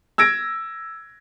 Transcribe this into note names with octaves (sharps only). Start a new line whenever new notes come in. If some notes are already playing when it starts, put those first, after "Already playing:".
E6 G#6 A#6 D7